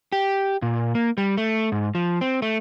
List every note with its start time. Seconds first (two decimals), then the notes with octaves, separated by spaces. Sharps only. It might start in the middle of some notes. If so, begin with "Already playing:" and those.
0.12 G4
0.62 A#2
0.95 A#3
1.18 G3
1.37 A3
1.72 G#2
1.95 F3
2.21 C4
2.42 A3